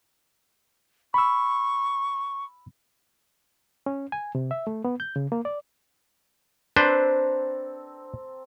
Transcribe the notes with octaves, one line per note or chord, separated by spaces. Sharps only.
B5 C#6 E6
C#4
G#5
C3
E5
A3
B3
G6
C#3
A#3
D5
C4 D4 A4 B4 C5 A#5